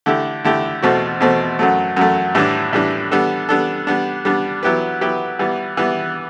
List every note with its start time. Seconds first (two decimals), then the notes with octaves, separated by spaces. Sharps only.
0.06 D3 A3 E4 G4
0.44 D3 A3 E4 G4
0.82 E2 B2 A3 C4 F#4
1.20 E2 B2 A3 C4 F#4
1.59 F#2 F#3 A3
1.97 F#2 F#3 A3
2.35 A2 E3 G3 D4
2.73 A2 E3 G3 D4
3.11 G3 B3 D4 A4
3.49 G3 B3 D4 A4
3.87 G3 B3 D4
4.25 G3 B3 D4
4.63 F#3 B3 E4 G4 B4
5.01 F#3 B3 E4 G4 B4
5.39 E3 G3 B3
5.77 E3 G3 B3